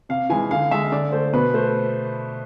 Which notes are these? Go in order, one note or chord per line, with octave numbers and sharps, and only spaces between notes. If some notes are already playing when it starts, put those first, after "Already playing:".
C3 F5
E3 G#3 G#5
D3 F5
G#3 E5
D3 D5
A3 C5
B2 B4
A3 C5